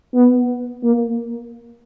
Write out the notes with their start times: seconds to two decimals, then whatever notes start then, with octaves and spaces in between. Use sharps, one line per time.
0.15 B3
0.84 A#3